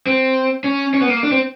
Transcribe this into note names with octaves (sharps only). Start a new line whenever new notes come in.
C4
C#4
C#4
B3
A#3
D4
C4